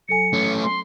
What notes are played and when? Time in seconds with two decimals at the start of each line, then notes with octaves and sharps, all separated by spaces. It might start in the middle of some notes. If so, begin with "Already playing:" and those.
0.09 F#3 A4 G#5 C#7
0.33 A3 C#4
0.63 C6